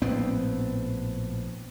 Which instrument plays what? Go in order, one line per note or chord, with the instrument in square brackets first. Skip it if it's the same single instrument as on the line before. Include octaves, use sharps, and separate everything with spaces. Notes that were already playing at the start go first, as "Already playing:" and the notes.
[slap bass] A#1 A2 B3 C4